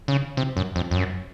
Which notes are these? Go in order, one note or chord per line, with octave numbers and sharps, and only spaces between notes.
C#3
C3
F#2
F2
F2
F#2